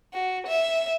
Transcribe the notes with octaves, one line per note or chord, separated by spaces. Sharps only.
F#4
E5